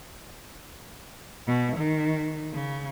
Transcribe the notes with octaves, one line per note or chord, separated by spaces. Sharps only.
B2
D#3
C#3